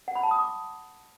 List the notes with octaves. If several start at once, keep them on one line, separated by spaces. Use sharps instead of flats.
F#5
B5
A5
D#6
D6